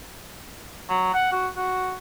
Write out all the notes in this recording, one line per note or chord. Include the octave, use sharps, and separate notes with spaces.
F#3
F#5
F#4
F#4